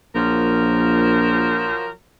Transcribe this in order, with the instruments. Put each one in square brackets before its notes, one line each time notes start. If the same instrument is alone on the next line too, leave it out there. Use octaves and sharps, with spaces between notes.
[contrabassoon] A#1 [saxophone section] F3 F#3 A#4